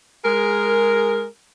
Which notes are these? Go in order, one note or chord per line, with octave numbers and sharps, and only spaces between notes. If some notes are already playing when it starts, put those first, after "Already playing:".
G#3 G#4 A#4